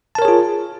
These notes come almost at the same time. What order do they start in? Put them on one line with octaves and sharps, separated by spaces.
A5 A#4 C#5 G#4 F4